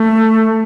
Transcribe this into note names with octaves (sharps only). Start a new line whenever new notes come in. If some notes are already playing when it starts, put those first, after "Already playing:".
Already playing: A3